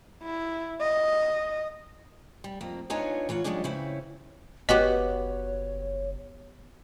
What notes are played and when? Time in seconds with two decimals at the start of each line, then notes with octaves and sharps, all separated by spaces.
0.23 E4
0.81 D#5
2.44 G3
2.61 F2 A#3 C4
2.90 B3 D4 D#4 F4 C#5 G#5
3.29 E3 F4 C#5 F#5
3.44 F3 G3 G#3 C#4 D4
3.64 C#3 C4 C#4 E4 B4
4.69 F#1 B3 F#4 G4 C#5 D#5